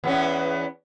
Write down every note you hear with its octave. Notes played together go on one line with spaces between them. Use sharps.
E2 B3 C#4